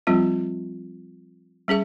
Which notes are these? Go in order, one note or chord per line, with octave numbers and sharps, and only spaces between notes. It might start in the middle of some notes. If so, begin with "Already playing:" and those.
F3 G3 C4 F4
G3 C#4 G#4 E5